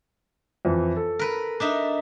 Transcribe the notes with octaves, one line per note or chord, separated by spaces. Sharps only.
F2 E3
A4
A#4 B4
D4 D#4 E5